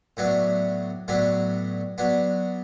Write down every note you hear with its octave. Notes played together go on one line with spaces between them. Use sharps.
A2 F#3 B3 D4
A2 F#3 B3 D4
F#3 B3 D4